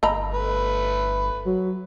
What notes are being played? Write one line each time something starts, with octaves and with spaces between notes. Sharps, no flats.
G1 D#5 A#5 B5
A3 B4
F#3